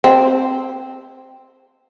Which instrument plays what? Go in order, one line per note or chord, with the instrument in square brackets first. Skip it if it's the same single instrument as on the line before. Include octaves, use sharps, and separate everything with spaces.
[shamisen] C4